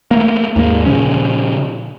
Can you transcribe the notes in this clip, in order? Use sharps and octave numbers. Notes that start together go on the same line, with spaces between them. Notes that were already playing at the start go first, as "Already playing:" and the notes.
A3 A#3
D#2 G#2 A#3
A#2 C#3 F3 C#4